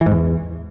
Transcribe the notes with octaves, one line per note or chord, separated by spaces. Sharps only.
E3
G#2
E2